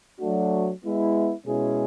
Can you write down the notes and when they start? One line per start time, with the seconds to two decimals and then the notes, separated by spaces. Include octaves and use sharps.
0.20 F#3 A3 D4 F#4
0.82 G#3 B3 E4
1.46 B2 G#3 C#4 E4 G#4